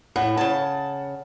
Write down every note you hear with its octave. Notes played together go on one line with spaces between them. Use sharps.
A2 F#5
C#3 A5